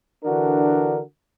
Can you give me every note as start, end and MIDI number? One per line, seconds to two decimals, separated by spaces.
0.24 1.00 50
0.24 1.00 52
0.24 1.00 62
0.24 1.00 66
0.24 1.00 70